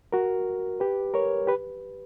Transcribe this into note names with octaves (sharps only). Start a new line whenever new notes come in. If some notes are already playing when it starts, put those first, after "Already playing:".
F#4 A#4
G4 B4
A#4 C#5
G4 B4